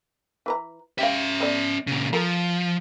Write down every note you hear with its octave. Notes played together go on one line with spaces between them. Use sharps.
E3 B4 A#5
C#4 G4 E5 F5
B3 A4 D5
A#2 C#3
F3 A4 A#4